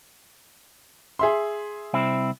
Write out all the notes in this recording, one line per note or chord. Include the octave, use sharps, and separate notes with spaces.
G#4 E5 C6
C2 C4 E4